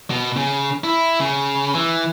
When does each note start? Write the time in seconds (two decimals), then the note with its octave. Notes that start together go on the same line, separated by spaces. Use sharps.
0.10 B2
0.37 C#3
0.84 E4
1.20 C#3
1.74 E3